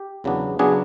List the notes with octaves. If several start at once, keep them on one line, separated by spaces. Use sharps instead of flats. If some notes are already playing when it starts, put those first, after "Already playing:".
Already playing: G4
E2 C#3 F#3 B3 D4
C#3 F#3 B3 D4 G#4